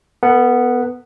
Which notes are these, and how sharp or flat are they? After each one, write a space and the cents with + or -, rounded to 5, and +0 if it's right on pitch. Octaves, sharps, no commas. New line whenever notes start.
B3 +0 A4 +45 F#5 +0